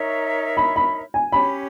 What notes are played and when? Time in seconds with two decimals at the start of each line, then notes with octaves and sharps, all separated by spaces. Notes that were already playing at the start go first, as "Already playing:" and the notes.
Already playing: D#4 A#4 C#5 E5 C#6
0.57 B5
0.76 B5
1.14 G#5
1.32 C#4 G4 C#5 B5